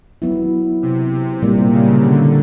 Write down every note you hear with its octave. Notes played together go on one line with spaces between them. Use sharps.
F#3 B3 E4
C3
C3
A#2 G3 A#3
C#3
D3